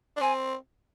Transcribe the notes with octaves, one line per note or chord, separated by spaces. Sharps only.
D4
C4 G#5